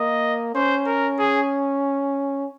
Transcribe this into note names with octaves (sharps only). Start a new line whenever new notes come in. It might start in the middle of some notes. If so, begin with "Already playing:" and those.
Already playing: A#3 D#5
C#4 C5
A#4
G#4